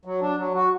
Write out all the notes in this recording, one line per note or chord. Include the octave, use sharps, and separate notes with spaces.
F#3
D4
F#3
F#4